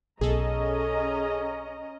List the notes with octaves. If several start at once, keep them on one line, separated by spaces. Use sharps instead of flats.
B1 C#4 G#4 A4 D#5 A#5